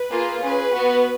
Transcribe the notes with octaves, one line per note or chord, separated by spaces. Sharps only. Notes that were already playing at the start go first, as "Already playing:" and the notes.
Already playing: B4
A#3 F4 G#4
C#4 G#4 B4
B3 F#4